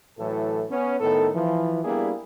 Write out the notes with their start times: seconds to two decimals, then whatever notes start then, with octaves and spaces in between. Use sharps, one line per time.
0.19 A2 E3 F#3 A4
0.70 B3 C#4
1.00 A2 D#3 B3 A4
1.35 E3 F3
1.85 G3 A#3 B3 D4 E4 G#4